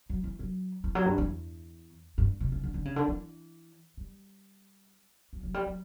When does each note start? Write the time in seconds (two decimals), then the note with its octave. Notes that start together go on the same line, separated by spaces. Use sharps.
0.10 F#3
0.24 E3
0.39 F#3
0.84 E3
0.95 F#3
1.06 G2
1.18 E2
2.18 G2
2.40 B2
2.52 C#3
2.63 D3
2.74 D3
2.85 C#3
2.96 D3
3.08 E3
3.97 G3
5.33 F#3
5.43 F#3
5.54 G3
5.66 F#3